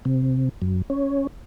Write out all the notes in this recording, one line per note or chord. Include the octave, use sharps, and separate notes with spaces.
C3
F#2
C#4